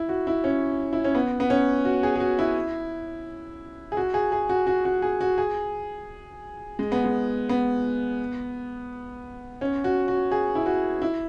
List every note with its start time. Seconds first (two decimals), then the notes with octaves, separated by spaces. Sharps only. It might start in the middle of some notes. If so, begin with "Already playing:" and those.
Already playing: E4
0.09 F#4
0.27 E4
0.44 C#4
0.93 E4
1.04 C#4
1.15 B3
1.40 B3
1.50 C#4
1.85 F#4
2.03 G#4
2.16 G#4
2.20 F#4
2.39 E4
3.92 G#4
3.97 F#4
4.14 G#4
4.32 G#4
4.49 F#4
4.67 F#4
4.85 F#4
5.02 G#4
5.21 F#4
5.38 G#4
6.79 G#3
6.92 B3
7.04 G#3
7.49 B3
9.61 C#4
9.84 F#4
10.08 F#4
10.32 G#4
10.55 E4
10.66 F#4
11.02 E4